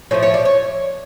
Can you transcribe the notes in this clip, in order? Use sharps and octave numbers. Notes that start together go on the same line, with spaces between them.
A2 F3 A3 C#5
C#5
D5
C#5